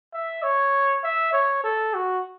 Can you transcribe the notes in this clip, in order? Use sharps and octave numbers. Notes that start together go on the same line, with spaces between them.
E5
C#5
E5
C#5
A4
F#4